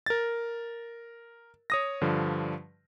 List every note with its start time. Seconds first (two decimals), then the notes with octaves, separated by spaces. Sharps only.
0.06 A#4 A6
1.70 C#5 D#6 A#6
2.01 G2 D3 F3